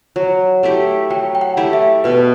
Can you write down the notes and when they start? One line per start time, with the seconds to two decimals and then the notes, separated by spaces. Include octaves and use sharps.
0.16 F#3
0.63 A3 E4 G4
1.10 F#3 G5
1.35 G5
1.41 F#5
1.57 A3 E4 G4
1.73 E5
2.04 B2 B4